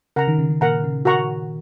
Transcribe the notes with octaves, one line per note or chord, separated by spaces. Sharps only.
C#3 A#4 F#5 A#5
D#3
C#3
C#3
A#2 A#4 F#5 A#5
C#3
F#4 A#4 F#5 A#5 C#6